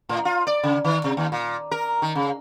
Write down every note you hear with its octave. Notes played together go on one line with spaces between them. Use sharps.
A2
F4
D5
C#3
D#3
C3
D#2
A#2
A#4
D#3
C#3